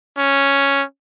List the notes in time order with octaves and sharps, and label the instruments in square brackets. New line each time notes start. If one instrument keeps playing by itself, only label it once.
[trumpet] C#4